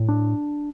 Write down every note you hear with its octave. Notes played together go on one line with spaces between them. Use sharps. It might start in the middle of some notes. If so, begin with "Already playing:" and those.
Already playing: A2
D4